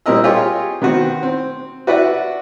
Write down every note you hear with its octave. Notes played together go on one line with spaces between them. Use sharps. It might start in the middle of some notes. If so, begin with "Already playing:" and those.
A#2 G3 C4 A#4 D#5 E6
F4 G4 G#4 C#5 D#5
D#3 B3 C4 F#4
C4
F#4 B4 D5 E5 F#5